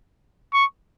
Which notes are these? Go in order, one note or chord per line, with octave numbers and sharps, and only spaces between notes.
C#6